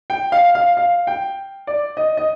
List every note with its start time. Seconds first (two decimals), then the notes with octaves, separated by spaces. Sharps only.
0.10 G5
0.32 F5
0.55 F5
0.77 F5
1.07 G5
1.67 D5
1.97 D#5
2.17 D#5